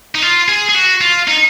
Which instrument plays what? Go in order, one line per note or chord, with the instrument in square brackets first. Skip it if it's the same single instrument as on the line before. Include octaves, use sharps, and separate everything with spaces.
[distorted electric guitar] D#4
F4
G#4
G#4
F#4
F4
D#4